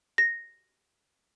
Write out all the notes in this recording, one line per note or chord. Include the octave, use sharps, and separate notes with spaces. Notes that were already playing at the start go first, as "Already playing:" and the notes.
A#6